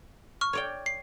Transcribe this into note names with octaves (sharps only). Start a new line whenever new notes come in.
C#6 F6
C#5 D5 G5
C7